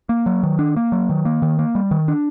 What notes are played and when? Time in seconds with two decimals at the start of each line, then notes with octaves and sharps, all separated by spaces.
0.09 A#3
0.26 F#3
0.43 D#3
0.59 D4
0.76 A#3
0.92 F#3
1.09 D#3
1.25 A#3
1.42 D#3
1.59 A#3
1.75 G3
1.91 D#3
2.08 D4